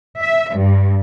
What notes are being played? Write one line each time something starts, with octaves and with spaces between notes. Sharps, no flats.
E5
G2